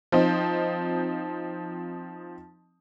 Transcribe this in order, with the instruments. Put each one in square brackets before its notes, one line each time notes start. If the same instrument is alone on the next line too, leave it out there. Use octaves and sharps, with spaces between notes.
[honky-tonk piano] F3 C4 D#4